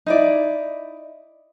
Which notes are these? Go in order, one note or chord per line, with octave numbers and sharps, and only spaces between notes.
D#4 E4 D5